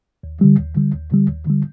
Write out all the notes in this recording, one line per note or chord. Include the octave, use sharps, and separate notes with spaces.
D#2
D3 G3
D#2
D3 G3
D#2
D3 G3
D#2
D3 G3